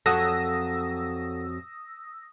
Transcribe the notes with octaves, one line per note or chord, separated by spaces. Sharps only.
F2 F#3 A4 F#5 D#6 E6 A#6